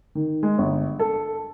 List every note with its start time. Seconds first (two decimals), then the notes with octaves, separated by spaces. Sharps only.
0.15 D#3
0.43 G#3
0.58 G1
0.99 A4